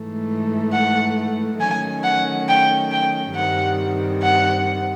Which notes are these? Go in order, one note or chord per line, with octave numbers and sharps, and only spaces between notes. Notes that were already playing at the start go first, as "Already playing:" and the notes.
Already playing: G#2 E3 A3
F#5
D#3 F#3 A3 C#4 G#5
F#5
G5
G5
G2 D#3 G3 C4 F#5
F#5